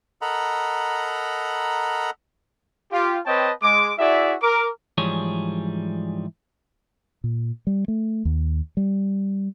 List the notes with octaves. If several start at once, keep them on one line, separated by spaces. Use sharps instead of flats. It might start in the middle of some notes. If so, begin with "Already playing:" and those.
A4 A#4 D#5 F#5 A#5 B5
F4 G4
C4 B4 C#5 D#5 G5 A5
G#3 D6
E4 F#4 G#4 D5 E5
A#4 D6
G#2 E3 F3 G3 G#4 C#5
A#2
G3
A3
D#2
G3